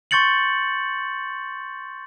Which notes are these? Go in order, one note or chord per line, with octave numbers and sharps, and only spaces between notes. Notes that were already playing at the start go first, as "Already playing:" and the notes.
C6 C#6 G6 A6 C#7 F#7